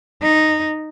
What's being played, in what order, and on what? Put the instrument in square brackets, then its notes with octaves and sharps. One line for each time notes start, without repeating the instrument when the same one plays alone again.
[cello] D#4